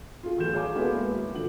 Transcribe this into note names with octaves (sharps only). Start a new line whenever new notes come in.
F4 G#4
B1 E3 A3 G6 E7
G#4 C#5 F5 G#5 D6
G#3 A#3 B3 E4 F#4 A4
B1
G#1 D3 F3 F#7